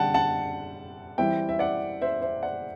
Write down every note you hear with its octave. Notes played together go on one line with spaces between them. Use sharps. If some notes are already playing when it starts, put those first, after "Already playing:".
Already playing: D3 G3 D4 F#5 G5 A5
F#5 A5
E3 G3 C4 E4 E5 G5
E5
D5 F#5
C5 E5
C5 E5
D5 F#5